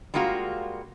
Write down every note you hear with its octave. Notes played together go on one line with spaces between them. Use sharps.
G3 G#3 A#3 F4 F#4